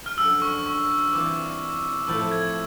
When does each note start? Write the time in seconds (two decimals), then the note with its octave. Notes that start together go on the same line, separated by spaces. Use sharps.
0.06 F6
0.18 F#2 D3 F3 E6
0.42 C#6
0.66 C#6
1.13 E3 G3 C4 F4 D6
2.07 A2 F3 A3 C4 E6
2.31 G#6